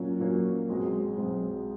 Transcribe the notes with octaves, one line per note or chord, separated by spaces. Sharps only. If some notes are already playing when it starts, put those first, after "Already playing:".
Already playing: A#2 F#3 A#3 C#4
A#2 F#3 A#3 C#4
B1 B2 G#3 C4
B1 B2 G#3 C4